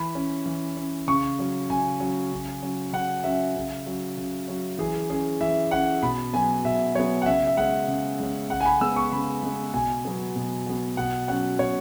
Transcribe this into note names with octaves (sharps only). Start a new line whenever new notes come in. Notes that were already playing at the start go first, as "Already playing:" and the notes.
Already playing: E3 B5
C#4
E3
C#4
C#3 C#6
F#3 C#4
C#3 G#5
F#3 C#4
C#3
F#3 C#4
C#3 F#5
F#3 C#4 E5
C#3
F#3 C#4
C#3
F#3 C#4
E3 G#4
C#4 G#4
E3 E5
C#4 F#5
B2 B5
F#3 B3 G#5
B2 E5
F#3 B3 C#5
F#5
C#3 E5
E5
G#3 C#4 F#5
C#3
G#3 C#4
C#3 F#5
G#5
B5
G#3 B3 E6
C#6
C#3 B5
G#3 B3
B2 G#5
F#3 B3
B2
F#3 B3
B2 F#5
F#3 C#4 F#5
B2 C#5